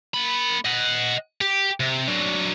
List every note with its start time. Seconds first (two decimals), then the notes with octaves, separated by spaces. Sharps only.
0.14 A#3 B5
0.65 D#5 F#5
1.41 G4
1.80 C3
2.08 F#3 D4